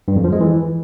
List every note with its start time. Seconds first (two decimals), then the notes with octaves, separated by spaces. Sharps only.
0.08 G2
0.16 F2
0.24 F3
0.32 G#3
0.41 E3